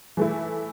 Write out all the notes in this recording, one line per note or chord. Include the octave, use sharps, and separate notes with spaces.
E3 A3 E4